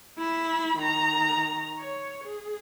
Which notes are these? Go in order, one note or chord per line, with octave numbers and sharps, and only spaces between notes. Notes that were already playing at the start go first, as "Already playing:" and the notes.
E4 B5
D#3 A#5
C#5
G#4